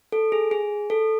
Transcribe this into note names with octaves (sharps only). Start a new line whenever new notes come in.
A4
G#4
G#4
A4